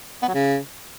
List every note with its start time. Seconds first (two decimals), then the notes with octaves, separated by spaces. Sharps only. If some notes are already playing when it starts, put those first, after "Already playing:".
0.23 B3
0.28 F#3
0.34 C#3